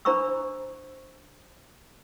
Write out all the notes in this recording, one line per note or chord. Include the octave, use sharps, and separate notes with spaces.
D4 C5 A#5 B5 C#6 E6